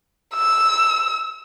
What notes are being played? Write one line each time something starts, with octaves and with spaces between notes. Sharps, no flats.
E6